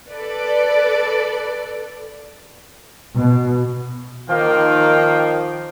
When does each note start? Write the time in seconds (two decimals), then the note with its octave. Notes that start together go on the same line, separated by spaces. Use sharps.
0.12 A4 B4 D5
3.15 B2
4.30 D#3 F3 A#3 F4 F5 G5